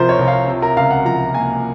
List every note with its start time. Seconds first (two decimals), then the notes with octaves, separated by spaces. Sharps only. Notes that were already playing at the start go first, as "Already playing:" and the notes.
Already playing: C2 C3 F3 A#4 C5
0.09 C#5
0.19 C2
0.28 F5
0.47 C3
0.62 A#4
0.77 C#2 F5
0.91 F#5
1.05 F3 A#5
1.34 A#3 G#5